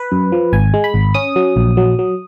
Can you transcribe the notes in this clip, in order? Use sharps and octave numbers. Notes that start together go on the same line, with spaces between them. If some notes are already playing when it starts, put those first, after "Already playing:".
Already playing: B4
F#2
F3
G#1 G#5
G#3
B5
G#1
C#4 D#6
F#3
A#1
F#3
F#3